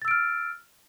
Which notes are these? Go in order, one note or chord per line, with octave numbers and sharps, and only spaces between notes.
E6 F6 A6 D7